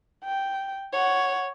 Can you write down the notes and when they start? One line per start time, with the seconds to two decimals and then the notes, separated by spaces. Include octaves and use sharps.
0.24 G5
0.93 C#5 F#5